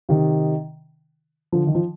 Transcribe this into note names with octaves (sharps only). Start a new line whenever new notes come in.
C3 D#3
D3 F3
D#3
F3